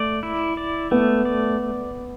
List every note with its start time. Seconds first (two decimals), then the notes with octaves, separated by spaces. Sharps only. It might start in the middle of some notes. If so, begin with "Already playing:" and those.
Already playing: A3 D5
0.23 E4
0.57 D5
0.91 A3 B3
1.25 D5